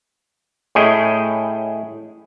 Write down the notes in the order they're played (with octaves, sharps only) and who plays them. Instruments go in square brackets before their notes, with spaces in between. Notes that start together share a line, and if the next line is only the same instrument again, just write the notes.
[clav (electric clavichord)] A2 C#4 E4 G#4 D#5 G5